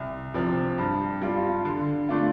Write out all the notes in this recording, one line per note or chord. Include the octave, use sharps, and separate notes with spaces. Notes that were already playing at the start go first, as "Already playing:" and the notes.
Already playing: C2
C3 F3
G2
G3 F4
D3
A3 D4 F4